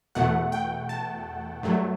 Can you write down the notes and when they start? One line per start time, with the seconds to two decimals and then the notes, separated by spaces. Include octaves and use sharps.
0.15 E2 B2 A3 F#5
0.52 G5
0.89 A5
1.63 G2 F#3 A3